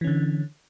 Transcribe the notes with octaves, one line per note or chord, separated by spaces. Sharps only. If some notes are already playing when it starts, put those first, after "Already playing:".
D3 E3 C#4